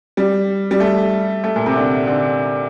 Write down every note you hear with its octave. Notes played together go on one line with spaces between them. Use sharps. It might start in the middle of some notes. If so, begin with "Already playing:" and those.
G3
G3
A3
A3
A#2
C3
D3
D3